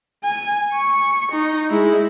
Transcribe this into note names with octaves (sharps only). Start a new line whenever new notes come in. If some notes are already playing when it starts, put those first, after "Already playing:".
G#5
C#6
D#4
G#3 E4